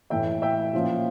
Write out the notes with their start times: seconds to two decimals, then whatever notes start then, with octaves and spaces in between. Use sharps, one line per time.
0.10 A2 E3 A3 E5 G5
0.42 E5 G5
0.73 A#2 F3 C#4 F4